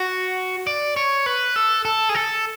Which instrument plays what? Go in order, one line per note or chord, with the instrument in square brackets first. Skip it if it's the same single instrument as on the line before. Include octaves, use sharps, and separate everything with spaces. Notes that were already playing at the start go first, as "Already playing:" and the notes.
Already playing: [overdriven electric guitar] F#4
D5
C#5
B4
A4
A4
G#4
A4